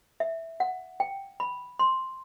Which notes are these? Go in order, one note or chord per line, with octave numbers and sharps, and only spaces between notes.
E5
F#5
G5
B5
C6